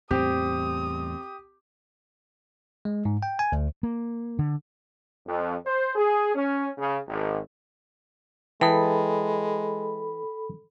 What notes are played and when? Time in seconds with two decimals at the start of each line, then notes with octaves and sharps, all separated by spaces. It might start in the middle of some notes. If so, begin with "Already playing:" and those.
0.11 E2 A2 G3 C4 G4 D#6
2.85 G#3
3.05 G#2
3.23 G5
3.39 G#5
3.52 D2
3.83 A#3
4.39 D3
5.27 F2
5.65 C5
5.95 G#4
6.35 C#4
6.78 C#3
7.08 G#1
8.61 E3 G#3 A4 G5 A5 B5 D#6